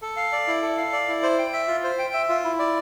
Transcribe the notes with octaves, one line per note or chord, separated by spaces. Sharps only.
A4
F5
D5
E4
A4
F5
D5
E4
C5
G5
E5
F4
C5
G5
E5
F4
E4
D5